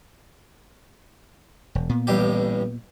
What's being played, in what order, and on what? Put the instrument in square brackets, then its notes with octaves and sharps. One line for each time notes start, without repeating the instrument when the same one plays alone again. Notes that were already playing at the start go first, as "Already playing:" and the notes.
[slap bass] E1
A#2 B3
[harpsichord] A1 G2 G4